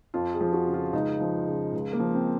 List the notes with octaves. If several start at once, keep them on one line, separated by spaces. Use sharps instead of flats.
F2 F4
G#4
F3
F#4
C#3
F4
C#2 D#4
F3
C#3
C#2
A#3
F3
C4